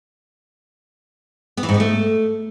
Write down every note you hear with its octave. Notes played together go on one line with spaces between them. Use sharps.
B3
E3
G#2
B3
A3